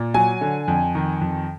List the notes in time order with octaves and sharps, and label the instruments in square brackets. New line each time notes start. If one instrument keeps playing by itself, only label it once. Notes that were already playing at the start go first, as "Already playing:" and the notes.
Already playing: [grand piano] A#2
F#3 G#5
D3
F2
D#3
F2